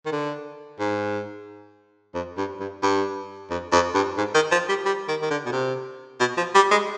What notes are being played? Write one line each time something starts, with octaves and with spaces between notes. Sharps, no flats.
D#3
D3
G#2
F2
G2
G2
G2
F2
F2
G2
G#2
D#3
F3
G3
G3
D#3
D#3
D3
B2
C3
B2
F3
G3
G#3